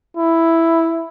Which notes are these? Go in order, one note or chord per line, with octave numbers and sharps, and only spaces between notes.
E4